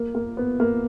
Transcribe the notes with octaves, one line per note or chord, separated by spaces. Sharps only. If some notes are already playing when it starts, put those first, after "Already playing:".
Already playing: A#3
A#3
B3
A#3